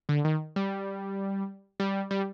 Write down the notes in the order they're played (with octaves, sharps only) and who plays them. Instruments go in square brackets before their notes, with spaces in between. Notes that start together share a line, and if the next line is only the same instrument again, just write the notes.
[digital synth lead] D3
D#3
G3
G3
G3